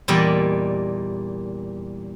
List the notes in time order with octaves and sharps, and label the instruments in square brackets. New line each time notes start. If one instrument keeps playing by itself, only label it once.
[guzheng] E2 A#2 G3 D5 D#5